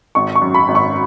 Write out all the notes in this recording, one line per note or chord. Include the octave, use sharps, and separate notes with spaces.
G#1 C#6
C#6
F#2
B5
G#1
C#6